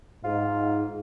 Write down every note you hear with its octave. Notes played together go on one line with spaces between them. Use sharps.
G#2 F4